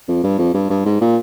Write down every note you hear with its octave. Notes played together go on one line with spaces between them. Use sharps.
F2
G2
F2
G2
G2
G#2
A#2